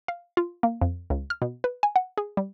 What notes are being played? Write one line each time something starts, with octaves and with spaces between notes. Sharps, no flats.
F5
F4
A#3
F2
C#2
F6
B2
B4
G#5
F#5
G#4
G3